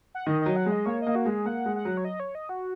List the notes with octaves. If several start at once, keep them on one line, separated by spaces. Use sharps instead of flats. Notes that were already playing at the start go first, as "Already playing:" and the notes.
F#5
D#3 D#5
F#3 D#5
F#5
G#3
D#5
A#3 C#5
A#3 D#5
F#4
G#3 G#4
A#3 F#5
G#3
F#5
F#3
C#5
D#5
C#5
D#5
F#4